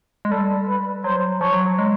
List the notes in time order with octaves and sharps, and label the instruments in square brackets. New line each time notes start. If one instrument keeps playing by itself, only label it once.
[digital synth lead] G#3
[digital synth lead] G3 [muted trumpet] A4
[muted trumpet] B4
[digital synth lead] F#3 [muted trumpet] C5
[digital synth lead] F3 [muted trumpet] C#5
[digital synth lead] F#3
F#3
G#3